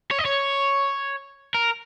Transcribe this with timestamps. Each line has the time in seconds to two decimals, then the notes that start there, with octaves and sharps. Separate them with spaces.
0.11 C#5
0.19 D#5
0.25 C#5
1.54 A#4